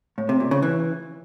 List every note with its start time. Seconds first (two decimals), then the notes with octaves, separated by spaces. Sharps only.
0.18 A2
0.29 C3
0.40 A#2
0.51 C#3
0.62 E3